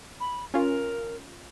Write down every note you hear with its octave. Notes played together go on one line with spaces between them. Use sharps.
B5
C#4 F4 A#4